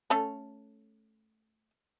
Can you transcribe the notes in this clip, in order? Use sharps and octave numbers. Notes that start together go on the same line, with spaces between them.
A3 C#4 A4